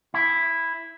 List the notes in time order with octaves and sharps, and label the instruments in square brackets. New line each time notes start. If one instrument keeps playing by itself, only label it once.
[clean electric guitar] E4